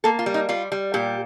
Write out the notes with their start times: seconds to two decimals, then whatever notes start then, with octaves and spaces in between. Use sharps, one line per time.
0.04 A#3 A4
0.19 F4
0.26 G3
0.34 D#4
0.49 G3 F4
0.72 G3
0.94 A#2 G4